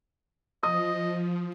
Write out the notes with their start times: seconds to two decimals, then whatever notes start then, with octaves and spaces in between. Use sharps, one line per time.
0.63 F3 D#5 D#6